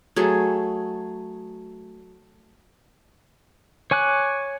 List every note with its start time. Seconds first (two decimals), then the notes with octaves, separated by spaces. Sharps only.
0.16 F#3 A3 G#4
3.91 C#5 G#5 D6 F#6